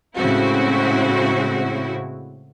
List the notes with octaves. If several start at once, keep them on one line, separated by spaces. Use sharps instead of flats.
A2 C#3 G#3 C4 E4 F#4